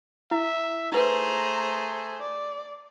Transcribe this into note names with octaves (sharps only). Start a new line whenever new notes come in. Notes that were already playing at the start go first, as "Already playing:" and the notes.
E4 E5
A3 D#4 G#4 B4 C5 A#5
D5